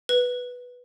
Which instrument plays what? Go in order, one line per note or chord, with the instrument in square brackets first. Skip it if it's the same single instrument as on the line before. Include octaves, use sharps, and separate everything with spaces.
[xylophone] B4